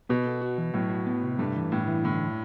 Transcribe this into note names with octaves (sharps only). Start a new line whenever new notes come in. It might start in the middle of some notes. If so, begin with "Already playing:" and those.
B2 B3
A4
F#4
E3
A2 F#3
F#4
B3
C3
G2 A3
E3
A2 E4
E3
A2 D3